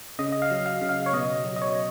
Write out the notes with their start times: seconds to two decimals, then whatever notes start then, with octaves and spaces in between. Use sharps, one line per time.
0.19 C#3 D#5
0.32 D#5
0.42 F5
0.51 F#3
0.66 F5
0.81 C#3
0.89 F5
1.06 C#5
1.13 B2 D#5
1.45 F#3
1.56 D#5
1.62 C#5